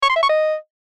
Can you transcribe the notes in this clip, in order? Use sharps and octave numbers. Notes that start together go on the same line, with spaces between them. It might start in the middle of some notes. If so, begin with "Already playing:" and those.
C#6
C6
E5
C#6
D#5